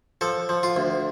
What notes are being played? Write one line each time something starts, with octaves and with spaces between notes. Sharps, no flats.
F3 A4
F3
F4
D2